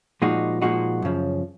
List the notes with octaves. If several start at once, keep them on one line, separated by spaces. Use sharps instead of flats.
A#2 F3 G#3 D#4 F#4
A#2 F3 G#3 D#4 F#4
F#2 C#3 F3